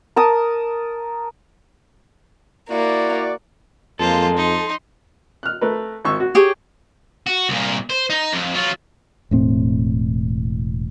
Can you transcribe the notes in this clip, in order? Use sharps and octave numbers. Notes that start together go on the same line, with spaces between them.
A#4 A5 D#6
A#3 E4 F#4 D5
F2 F3 G#3 A#3 F4 A4 C5
D#4 C6
F6 F#6
A3 A#4 B4
G#1 C#6 E6
F#4
G4 G#4 C#5
F#4
C2 A#2
C5
D#4
F2
F#3 F4
E1 A2 C4